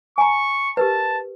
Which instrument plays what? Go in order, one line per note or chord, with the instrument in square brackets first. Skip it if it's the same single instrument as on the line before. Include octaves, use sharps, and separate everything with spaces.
[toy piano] G#5 A#5 [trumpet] C#6
[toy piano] G4 A#4 B4 [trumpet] A5